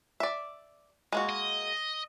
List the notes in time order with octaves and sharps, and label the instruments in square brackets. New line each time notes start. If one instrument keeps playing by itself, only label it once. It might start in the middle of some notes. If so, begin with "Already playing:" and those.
[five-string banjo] D5 E5
G#3 A#3 F#4
[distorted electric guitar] D#5